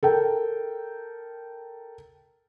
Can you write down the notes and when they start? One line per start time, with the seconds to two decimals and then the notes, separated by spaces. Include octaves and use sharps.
0.03 A4 A#4 G5